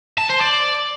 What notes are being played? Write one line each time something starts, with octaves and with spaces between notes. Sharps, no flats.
A5
C5
D5